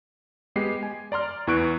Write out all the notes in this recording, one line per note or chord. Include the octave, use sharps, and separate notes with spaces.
G#3 B3 G4 C7
G#5
D5 A#5 C6 F6
E2 E3 C#6 F#6 D7